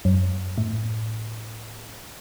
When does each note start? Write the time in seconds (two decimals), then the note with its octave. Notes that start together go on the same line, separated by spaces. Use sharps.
0.05 F#2
0.58 A2